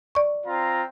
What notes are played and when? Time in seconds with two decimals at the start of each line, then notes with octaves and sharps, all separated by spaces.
0.15 D5 C#6
0.46 C4 F4 A#5